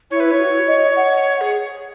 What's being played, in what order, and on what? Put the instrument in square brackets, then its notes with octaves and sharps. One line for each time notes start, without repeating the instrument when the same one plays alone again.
[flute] E4 [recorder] C#5
[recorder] B4
C#5
[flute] F#4
D#5
F#5
[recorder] G#4